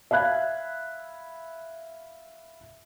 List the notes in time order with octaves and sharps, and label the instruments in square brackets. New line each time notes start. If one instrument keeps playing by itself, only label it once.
[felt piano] E5 F5 B5 F#6 G#6